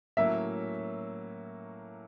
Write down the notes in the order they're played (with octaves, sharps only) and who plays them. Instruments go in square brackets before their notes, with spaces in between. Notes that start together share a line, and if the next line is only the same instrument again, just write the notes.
[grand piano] A2 F#3 A#3 C#4 [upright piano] E5